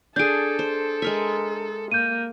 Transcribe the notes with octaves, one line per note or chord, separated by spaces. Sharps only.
D4 G#4 A4 G6 D7
C5
G#3 A#4 E5
A#3 G6 D#7